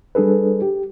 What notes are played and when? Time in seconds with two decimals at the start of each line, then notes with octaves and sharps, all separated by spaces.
0.15 G3 D4 G#4 A4 B4
0.62 G4